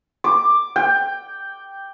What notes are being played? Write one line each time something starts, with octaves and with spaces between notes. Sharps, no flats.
D6
G5